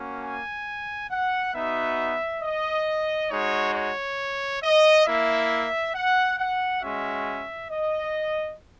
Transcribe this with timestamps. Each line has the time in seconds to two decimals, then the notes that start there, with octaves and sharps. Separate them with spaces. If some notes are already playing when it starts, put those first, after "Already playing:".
Already playing: A#3 C#4 F#4
0.22 G#5
1.10 F#5
1.54 B3 D#4 F#4 E5
2.42 D#5
3.29 G#3 D#4 F#4 C#5
3.75 C#5
4.62 D#5
5.06 A#3 E4 E5
5.94 F#5
6.38 F#5
6.82 G#3 C#4 F#4 E5
7.70 D#5